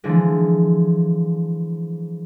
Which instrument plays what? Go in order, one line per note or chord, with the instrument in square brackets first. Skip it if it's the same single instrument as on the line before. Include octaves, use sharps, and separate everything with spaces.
[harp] D3 E3 F3 G#3